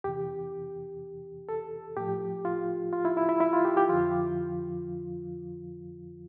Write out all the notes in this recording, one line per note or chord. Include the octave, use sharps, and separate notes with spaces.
E2 C3 E3 G4
A4
A2 F3 G4
F4
F4
E4
E4
E4
E4
F4
G4
G4
F2 D3 F3 F4